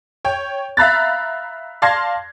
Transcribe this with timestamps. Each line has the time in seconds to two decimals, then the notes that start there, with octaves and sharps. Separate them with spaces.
0.25 C#5 G5
0.77 E5 F5 A#5 B5 F#6 A6
1.82 D5 F5 A5 C6 G#6 A#6